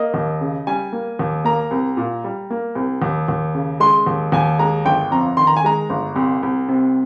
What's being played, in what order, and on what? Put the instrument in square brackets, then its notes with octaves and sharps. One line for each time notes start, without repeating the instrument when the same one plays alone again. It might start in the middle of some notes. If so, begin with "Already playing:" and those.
Already playing: [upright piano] A#3 D#5
D#2
C#3
G3 G#5
A#3
D#2
A#3 A#5
C2
A#2
G3
A#3
C2
D#2
D#2
C#3
G#3 C6
D#2
D#2 G#5
G#3 A#5
G1 G5
F2 A#5
D#3 C6
A#5
G#5
G#3 A#5
G1
C2
C2
C3